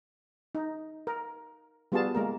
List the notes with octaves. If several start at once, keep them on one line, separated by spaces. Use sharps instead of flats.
D#4
A#4
G3 B3 F4 F#4 G#4 A5
G#3 A#3 A#4